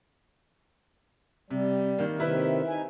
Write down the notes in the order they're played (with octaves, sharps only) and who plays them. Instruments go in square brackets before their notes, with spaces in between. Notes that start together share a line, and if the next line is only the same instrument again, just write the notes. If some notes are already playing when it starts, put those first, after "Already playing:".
[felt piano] C3 [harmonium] G3
[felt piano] D#3 A#3
[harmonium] C3 D#3 E5 [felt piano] E4 B4
[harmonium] D#4 G#5